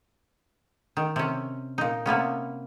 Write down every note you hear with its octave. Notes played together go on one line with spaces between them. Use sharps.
D#3
C3 C#4
A#2 D#4
C3 A#3 B3 C#4